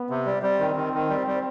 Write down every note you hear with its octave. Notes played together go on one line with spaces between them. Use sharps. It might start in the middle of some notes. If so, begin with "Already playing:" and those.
Already playing: B3
C3
G3
G3 C4
D#3
D#3
D#3
G3
G3